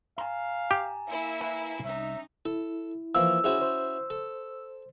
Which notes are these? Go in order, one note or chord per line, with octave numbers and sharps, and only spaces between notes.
F5 G#5 A#5
G4
A#3 E4 E5
B4 G#5
C2 C#4 D#4 E5
E4 A4
E3 F3 A#3 E6
C#4 E4 F#4 G#4 C5
C5
A4